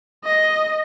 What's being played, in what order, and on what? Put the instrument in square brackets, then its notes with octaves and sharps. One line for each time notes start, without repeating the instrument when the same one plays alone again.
[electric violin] D#5